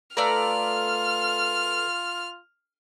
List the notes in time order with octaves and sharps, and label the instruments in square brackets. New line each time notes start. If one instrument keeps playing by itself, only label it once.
[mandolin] A3 D5 A#5 [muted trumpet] F4 [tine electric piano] A4 B4 F5 [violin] F6